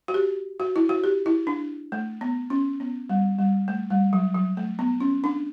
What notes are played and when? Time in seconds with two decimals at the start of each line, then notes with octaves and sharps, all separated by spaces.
0.08 F#4
0.14 G4
0.60 F#4
0.76 E4
0.89 F#4
1.04 G4
1.26 E4
1.47 D4
1.92 A3
2.21 B3
2.50 C#4
2.80 B3
3.10 G3
3.39 G3
3.68 A3
3.90 G3
4.13 F#3
4.35 F#3
4.57 A3
4.79 B3
5.00 C#4
5.24 D4